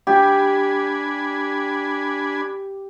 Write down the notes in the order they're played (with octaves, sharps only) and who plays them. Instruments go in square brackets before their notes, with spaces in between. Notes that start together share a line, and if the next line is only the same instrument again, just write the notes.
[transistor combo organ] D4 G#5 B5 [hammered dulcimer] G4